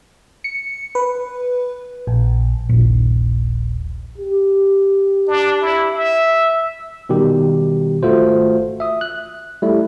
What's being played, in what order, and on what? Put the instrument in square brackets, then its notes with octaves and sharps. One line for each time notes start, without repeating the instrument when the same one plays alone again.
[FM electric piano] C#7
B4
A#1
[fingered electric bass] D#1 A#1
[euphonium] G4
[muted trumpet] D4
E4
E5
[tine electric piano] B2 D#3 G3 G4
G#1 A3 F4 F#4 C5
E5 D#6
F#6
G3 A3 E4